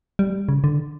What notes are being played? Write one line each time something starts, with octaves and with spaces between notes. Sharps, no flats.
G3
C#3
D3